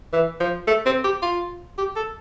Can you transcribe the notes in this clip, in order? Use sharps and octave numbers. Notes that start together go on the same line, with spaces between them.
E3
F3
A3
C4
G4
F4
G4
A4